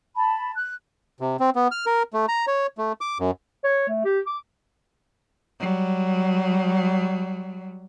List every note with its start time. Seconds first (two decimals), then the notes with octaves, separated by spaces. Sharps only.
0.15 A5 B5
0.55 F#6
1.20 C3
1.40 C4
1.55 B3
1.71 F6
1.86 A#4
2.13 A3
2.28 A#5
2.47 C#5
2.78 A3
3.01 D6
3.20 F#2
3.64 C#5
3.89 A3
4.05 G4
4.27 D6
5.60 F#3 G3